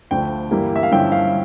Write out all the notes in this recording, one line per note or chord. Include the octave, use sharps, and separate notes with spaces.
D2 D3 F3 G5
G2 E3 G3 A#3 E4
E5
F5
G2 D3 F3 C#4 E4 G5
F5